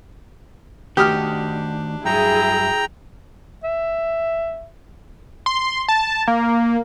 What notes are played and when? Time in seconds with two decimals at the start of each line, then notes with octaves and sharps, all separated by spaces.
0.97 D#3 A3 D4 F#4 G4 D#6 F6
2.05 G2 F#3 E4 G#4 G5 A#5
3.64 E5
5.46 C6
5.88 A5
6.28 A#3